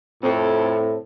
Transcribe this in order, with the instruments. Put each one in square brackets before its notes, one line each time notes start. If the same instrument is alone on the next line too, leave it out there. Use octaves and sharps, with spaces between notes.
[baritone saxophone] F2 [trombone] A2 [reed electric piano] C4 C5